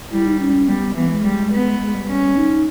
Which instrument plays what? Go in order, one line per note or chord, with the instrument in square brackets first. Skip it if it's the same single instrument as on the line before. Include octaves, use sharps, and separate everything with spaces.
[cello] G3 [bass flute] E4
[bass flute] D#4
C#4
[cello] G3 [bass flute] B3
[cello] E3 [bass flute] B3
[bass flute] G#3
[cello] G3
B3
[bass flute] G#3
G3
[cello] C#4
[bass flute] D#4